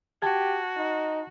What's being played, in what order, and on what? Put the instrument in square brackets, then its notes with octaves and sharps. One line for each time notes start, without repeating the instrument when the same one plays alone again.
[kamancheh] F#4 [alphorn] G4 [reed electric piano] A5 G#6
[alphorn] D#4